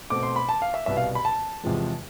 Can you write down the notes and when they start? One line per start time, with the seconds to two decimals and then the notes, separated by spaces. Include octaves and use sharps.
0.10 B2 A3 C4 D6
0.23 C6
0.36 B5
0.49 A5
0.62 F5
0.74 E5
0.86 C2 B2 B3 E5
0.97 F5
1.15 B5
1.25 A5
1.63 E2 C3 F3 G#3